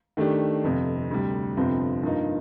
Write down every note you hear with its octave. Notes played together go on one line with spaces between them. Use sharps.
D#3 A3 D4 G4
G1 F2 C3
D2 C3 G3
G1 F2 C3 F3 C4
G2 F3 A#3 D#4